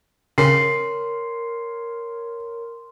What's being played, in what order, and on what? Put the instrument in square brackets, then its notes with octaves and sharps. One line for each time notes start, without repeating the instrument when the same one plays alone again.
[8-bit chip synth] C#3 [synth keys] A#4 C#5 [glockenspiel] C6 [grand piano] C7